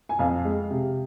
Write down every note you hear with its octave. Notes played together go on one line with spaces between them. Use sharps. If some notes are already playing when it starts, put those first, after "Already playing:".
G#5
F2 F5
G#3
C3